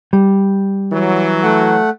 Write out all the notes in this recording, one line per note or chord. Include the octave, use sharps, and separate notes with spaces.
G3
E3 F#3
A3 F#5